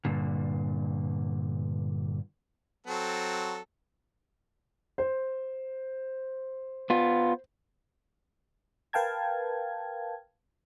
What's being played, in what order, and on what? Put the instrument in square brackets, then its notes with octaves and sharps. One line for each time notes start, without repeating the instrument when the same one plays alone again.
[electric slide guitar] G2 A#2 D3
[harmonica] F#3 C4 A4
[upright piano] C5
[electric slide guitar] B3 F4
[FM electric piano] A#4 B4 F5 G5 A5 G#6